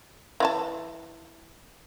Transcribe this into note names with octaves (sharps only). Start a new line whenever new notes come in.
E3 F4 A5